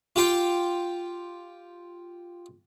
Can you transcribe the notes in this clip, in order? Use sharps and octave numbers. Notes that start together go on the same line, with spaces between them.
F4 G4 G5